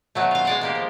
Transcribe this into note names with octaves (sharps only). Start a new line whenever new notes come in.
B2 F#3 A3
F4 F5
G#3 D5 F#5
G#3 A#3 G4
F3